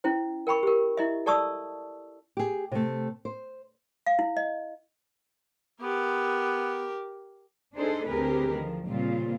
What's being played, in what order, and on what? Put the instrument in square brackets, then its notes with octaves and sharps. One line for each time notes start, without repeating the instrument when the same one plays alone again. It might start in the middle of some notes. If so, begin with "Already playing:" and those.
[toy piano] C#4 E4 C5
A#4 G5 B5 C#6
G4 A#4
E4 D#5 E5
A4 D5 A5 C#6 D#6 E6
[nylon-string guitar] G4 G#4
C3 A3
C5
[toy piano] F5
E4
D#5
[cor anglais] B3 [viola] G4 A#4
[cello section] D4 D#4 G#4 A4 C5
D2 C4 G4 G#4 A#4 B4
D#3 F3
A#2 C#3 G3 C4 F4